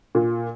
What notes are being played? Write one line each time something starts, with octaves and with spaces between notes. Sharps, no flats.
A#2